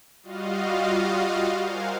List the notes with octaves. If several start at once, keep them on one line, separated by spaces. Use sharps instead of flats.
G3 F4 F#4 D#5 F5
A#4 C5 F5 F#5 G#5